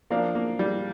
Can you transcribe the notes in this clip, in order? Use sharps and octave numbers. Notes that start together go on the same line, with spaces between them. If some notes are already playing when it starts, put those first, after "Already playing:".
F3 A#3 D4 A#4 F5
A#3
G3